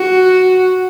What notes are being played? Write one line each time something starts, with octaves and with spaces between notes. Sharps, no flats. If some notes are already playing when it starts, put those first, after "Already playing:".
Already playing: F#4